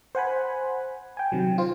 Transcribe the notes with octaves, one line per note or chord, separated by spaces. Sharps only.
C5 F#5 G#5 B5
G5 G#5
C3 D#3 F#3
F4 C5